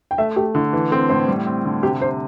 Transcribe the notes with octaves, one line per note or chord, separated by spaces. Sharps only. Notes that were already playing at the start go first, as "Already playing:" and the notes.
G5
A3 E5
A3 G4
D3 E4
E3
C4 A4
A2 C5
G3
C4
D3
C3 G4
C3 C5